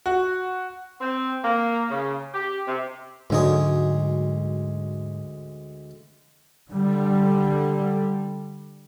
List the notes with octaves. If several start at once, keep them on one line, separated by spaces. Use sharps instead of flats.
F#4
C4
A#3
C#3
G4
C3
D2 G#2 D3 F#3 G#3 G#4
D3 G3